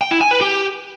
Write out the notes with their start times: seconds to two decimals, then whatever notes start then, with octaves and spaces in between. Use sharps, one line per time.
0.01 G5
0.11 E4
0.21 G#5
0.31 B4
0.41 G4